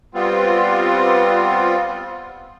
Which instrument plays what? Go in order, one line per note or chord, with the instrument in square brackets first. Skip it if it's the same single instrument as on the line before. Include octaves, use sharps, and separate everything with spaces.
[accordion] G3 B3 C4 F4